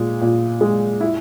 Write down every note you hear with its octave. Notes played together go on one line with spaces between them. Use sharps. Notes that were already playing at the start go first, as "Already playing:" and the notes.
Already playing: A#2 G#3
A#2
G#3
E4